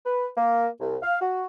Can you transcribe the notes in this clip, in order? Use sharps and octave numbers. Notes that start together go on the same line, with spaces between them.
B4
A#3
C2
F5
F#4